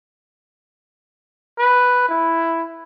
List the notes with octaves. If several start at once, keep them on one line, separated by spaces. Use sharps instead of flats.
B4
E4